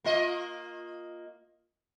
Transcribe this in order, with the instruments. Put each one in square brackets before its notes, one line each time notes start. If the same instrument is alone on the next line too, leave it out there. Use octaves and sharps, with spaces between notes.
[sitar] A#3 F4 D#5